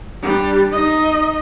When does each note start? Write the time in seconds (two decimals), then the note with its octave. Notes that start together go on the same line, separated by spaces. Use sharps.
0.22 G3 D4
0.72 D#4 D#5